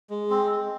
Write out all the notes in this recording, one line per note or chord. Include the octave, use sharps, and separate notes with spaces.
G#3
C4
C4